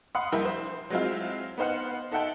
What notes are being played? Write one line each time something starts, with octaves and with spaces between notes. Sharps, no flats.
F5 F#5 B5 C6 D#6
A#1 G3 E4 G4 A#4
C5
F#3 G#3 C4 E4 F4
B3 D#4 C5 F5 F#5
D#4 A4 E5 F#5 G5 A5